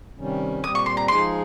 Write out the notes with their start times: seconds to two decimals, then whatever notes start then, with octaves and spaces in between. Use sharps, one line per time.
0.18 C3 D#3 G3 C#4
0.63 A#2 G3 C4 D#6
0.75 C#6
0.86 C6
0.97 A#5
1.08 F3 G#3 D#4 G#4 C6